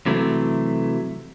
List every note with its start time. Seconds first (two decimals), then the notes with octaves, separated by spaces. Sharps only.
0.06 C3 E3 F#3 A3